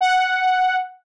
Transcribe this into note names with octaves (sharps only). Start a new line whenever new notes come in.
F#5